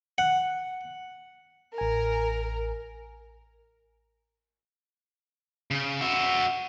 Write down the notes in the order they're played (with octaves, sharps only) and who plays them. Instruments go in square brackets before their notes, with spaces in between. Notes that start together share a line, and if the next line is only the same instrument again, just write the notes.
[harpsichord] F#5
[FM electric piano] A1 G#5 [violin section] A#4
[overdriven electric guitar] C#3
F#4 E5